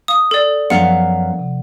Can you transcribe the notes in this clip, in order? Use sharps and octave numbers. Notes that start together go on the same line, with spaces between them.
F5 D#6
A4 D5
F#2 F3 B3 F5 F#5
C3